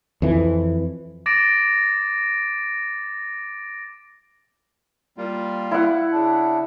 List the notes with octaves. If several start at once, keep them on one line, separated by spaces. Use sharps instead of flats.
F2 E3
D6 A6 A#6 D7
G3 A#3 F4
E4 F#5
C#3 D4